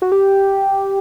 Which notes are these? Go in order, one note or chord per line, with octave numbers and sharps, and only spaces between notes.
F#4
G4